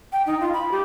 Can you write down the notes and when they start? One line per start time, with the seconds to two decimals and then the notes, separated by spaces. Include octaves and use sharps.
0.13 G5
0.26 D#4
0.40 F4
0.53 B5
0.71 G4